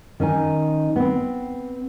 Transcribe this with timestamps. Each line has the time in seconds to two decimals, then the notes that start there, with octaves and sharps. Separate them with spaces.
0.20 D#3 C#4 D#4 G#5
0.96 B3 C4